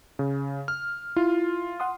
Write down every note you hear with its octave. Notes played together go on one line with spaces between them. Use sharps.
C#3
F6
E4 F4
F#5 C6 D#6